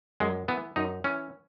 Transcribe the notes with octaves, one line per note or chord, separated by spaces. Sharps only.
F#2 G#3
E3 B3
F#2 D#4
E3 C#4